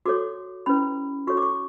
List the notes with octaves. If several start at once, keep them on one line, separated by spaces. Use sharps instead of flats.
F#4 A4 C#5 D6
C#4 E4 B4 B5
F#4 A4 C#5 C#6
D6
C#6